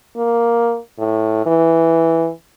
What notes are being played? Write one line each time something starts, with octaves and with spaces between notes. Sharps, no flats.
A#3
A2
E3